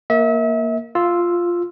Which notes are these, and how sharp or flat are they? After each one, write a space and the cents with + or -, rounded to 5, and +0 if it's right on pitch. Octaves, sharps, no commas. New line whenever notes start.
A#3 +0 E5 -35
F4 +0 E6 +0